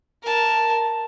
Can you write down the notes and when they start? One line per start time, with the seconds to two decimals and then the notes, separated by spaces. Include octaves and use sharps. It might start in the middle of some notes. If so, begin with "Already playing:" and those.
0.23 A#4 A5